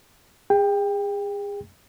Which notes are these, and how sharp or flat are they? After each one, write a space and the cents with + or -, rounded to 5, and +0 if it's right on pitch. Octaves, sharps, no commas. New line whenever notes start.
G#4 -35 G5 +20